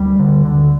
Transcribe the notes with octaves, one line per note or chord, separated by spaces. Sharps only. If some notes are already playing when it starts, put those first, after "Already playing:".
Already playing: D2 G3
D3
D3